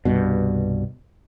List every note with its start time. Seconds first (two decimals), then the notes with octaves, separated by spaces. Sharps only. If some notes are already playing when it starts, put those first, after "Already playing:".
0.05 C2 G2 B2